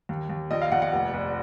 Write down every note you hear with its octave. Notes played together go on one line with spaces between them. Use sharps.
D#2
D#2
A#1 D#5
F5
A#1 F#5
F#5
F1
F1